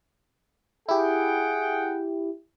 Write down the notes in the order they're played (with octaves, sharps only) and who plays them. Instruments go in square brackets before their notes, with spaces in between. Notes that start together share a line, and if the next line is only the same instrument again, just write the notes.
[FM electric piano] E4 G4 [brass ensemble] G#4 F#5 G5